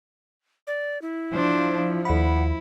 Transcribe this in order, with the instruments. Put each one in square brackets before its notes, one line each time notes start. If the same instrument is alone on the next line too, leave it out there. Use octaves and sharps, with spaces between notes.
[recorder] D5
E4
[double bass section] F3 [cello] D4 C5
[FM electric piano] D#2 B5 [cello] E4 [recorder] F#5